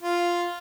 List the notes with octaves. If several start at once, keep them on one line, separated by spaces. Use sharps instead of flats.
F4